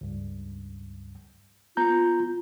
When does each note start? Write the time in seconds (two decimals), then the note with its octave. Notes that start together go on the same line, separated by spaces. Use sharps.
0.01 C#2 G2
1.77 B3 F4 A#5 G6